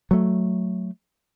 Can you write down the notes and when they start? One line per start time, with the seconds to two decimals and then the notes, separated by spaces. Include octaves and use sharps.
0.11 F#3 A3